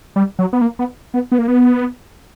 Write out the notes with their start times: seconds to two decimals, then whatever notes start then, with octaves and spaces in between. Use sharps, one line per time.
0.16 G3
0.39 F#3
0.53 B3
0.61 A#3
0.79 B3
1.14 B3
1.32 B3
1.39 A#3
1.48 B3